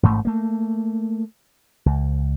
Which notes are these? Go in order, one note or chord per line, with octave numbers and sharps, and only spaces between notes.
A1 G#2 A3
A3 A#3
C#2